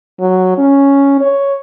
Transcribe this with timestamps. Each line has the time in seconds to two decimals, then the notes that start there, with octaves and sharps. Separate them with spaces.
0.20 F#3
0.58 C#4
1.21 C#5